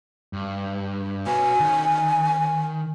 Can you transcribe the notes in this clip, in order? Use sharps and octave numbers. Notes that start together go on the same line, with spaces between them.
G2
F#4 B4 G#5
D#3